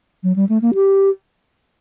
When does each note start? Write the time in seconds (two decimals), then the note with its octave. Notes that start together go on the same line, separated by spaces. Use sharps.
0.24 F#3
0.36 G3
0.49 A3
0.62 A#3
0.74 G4